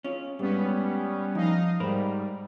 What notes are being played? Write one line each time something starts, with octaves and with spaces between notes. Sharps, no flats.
C#4 F4
G#2 G3 B3 C#4
F3 D#4 D#5 F5
G#2 G3 A#4 C5 B5